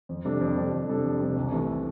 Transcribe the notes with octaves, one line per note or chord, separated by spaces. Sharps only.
F2
C3 G3 D4 A4
F2
C3 G3 D4 A4
F2
C3 G3 D4 A4
F2
C3 G3 D4 A4
C2
C3 E3 A3